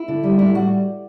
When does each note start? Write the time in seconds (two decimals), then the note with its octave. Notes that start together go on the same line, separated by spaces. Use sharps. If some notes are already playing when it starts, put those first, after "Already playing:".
Already playing: E4
0.08 D3
0.23 G3
0.39 A2 E4
0.55 G3 F#4